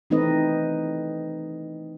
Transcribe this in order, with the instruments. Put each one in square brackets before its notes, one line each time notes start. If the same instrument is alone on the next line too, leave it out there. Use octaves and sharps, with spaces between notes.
[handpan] E3 A3 C4 D#4 B4 D#5